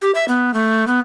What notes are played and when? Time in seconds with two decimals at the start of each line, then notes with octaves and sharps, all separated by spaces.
0.02 G4
0.15 E5
0.28 B3
0.54 A3
0.87 B3